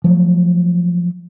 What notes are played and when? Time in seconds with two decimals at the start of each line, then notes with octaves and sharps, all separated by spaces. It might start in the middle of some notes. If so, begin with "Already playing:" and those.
0.04 F3 F#3 A3